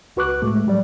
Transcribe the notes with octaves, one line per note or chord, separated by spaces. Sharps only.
C#2 F#4 B4 C#6 D6 F#6
A2 G#3 A3
F#3 G3 D5